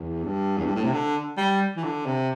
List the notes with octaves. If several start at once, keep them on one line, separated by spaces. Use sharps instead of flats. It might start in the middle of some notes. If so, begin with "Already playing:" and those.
Already playing: E2
G2
E2
G2
A2
C3
D3
G3
E3
D3
C3